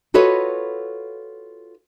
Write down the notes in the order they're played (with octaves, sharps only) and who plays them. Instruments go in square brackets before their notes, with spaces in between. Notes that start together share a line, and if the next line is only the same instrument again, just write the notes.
[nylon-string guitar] F4 F#4 A4 B4 C#5 D#5